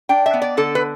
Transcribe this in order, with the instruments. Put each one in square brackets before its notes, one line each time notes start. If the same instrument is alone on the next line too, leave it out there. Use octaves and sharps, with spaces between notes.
[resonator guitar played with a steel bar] D4 G5
E5
B3
D5
D3 A4
B4